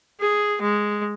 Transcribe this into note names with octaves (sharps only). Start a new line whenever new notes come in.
G#4
G#3